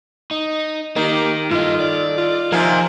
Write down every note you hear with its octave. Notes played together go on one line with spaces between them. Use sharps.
D#4
D#3 A#3 G4
G2 F4 A4 D#5
D5
F4
C3 D#3 F3 A#3 G#5